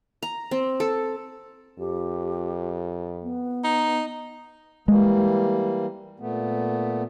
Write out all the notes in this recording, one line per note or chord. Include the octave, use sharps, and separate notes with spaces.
A#5
C4
A4
F2 G4
B3
D#4
E3 G3 G#3 A#3
A#2 A3 B3